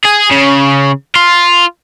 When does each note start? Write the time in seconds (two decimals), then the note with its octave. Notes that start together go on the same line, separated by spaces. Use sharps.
0.05 G#4
0.31 C#3
1.16 F4